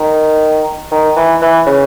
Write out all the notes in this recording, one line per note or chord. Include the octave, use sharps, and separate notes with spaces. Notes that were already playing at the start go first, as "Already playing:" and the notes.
Already playing: D#3
D#3
E3
E3
C#3